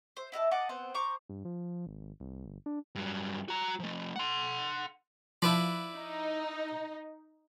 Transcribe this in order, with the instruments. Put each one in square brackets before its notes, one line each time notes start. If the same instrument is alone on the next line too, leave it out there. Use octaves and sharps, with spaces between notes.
[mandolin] C5
E4 D#5 F5 A5
D#5 F#5 A5 D6
B3 C4 C5 F#5
C5 A#5 C#6 D6
[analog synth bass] G2
F3
G#1
G#1
C2
G1
D4
[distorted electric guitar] G2 F#3
F#4 A#5
F3 A3
F#5 C6
[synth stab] F3 [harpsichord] E4 B4 D5
[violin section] D#4